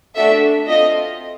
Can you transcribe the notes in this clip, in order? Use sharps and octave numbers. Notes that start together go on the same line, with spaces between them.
A3 D4 F#4 A4 E5
C4 F4 A4 D#5